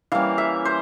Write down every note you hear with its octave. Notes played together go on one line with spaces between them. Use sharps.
E3 G3 A#3 C#4 F5
E5
C5